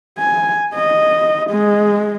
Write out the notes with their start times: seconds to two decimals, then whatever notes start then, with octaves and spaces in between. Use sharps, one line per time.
0.19 G#5
0.74 D#5
1.50 G#3